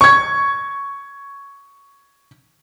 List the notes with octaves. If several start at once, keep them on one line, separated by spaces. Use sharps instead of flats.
C#6 G#6